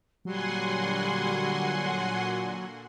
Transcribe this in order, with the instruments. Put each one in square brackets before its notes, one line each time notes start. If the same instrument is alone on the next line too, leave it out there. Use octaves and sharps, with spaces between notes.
[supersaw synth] A#2 D3 F#4 [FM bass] F#3 [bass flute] G3 [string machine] F#5 G#5 C6